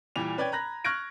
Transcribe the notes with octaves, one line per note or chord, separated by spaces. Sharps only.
A#2 E3 G3 F7
C#4 B4 D5 G5 G#6
A#5 B5 F#6 A#6
C#6 F6 F#6 G#6 A#6 D7